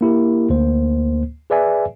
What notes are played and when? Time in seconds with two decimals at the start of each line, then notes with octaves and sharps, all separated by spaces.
0.01 A#3 E4 G4 A#4
0.50 D2 A#3 C5
1.50 G#4 B4 D5 E5 G#5